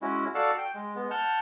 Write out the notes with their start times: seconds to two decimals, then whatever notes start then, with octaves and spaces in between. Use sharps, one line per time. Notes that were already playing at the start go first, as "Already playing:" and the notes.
0.02 G#3 C#4 E4 F#4
0.35 F#4 A4 D5 F5 F#5 E6
0.58 G5
0.75 G#3
0.96 G#3 B3
1.11 F#5 A5 F6 G6